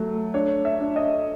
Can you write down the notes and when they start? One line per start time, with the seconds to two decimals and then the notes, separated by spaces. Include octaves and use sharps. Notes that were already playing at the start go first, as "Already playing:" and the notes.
Already playing: F#3 A3
0.34 D4 C#5
0.65 E5
0.80 D4
0.96 D#5